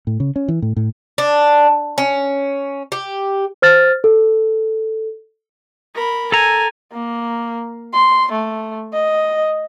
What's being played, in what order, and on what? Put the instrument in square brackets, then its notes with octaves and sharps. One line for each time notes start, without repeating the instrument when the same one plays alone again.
[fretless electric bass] A2
C#3
C#4
E3
A2
A2
[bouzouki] D4
C#4
G4
[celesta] C5 F6 A6
A4
[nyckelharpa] A#4 B5
[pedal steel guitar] A4 A#5 [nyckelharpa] G#5
[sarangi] A#3
C6
A3
D#5